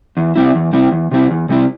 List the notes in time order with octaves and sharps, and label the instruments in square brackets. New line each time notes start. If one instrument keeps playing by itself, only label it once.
[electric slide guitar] E2
C3 G3 C4 E4
E2
C3 G3 C4 E4
E2
C3 G3 C4 E4
E2
C3 G3 C4 E4